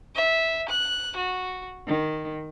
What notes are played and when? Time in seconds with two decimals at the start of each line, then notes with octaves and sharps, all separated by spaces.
0.15 E5
0.70 F#6
1.16 F#4
1.87 D#3